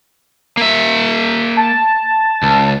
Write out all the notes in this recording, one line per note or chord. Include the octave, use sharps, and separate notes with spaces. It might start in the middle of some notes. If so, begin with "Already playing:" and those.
A#3 E5
A5
C#2